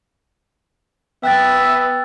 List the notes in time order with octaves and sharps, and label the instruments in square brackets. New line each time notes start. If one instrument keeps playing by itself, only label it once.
[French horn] B3 [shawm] E5 [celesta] G5 [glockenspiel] E6 F#6 A6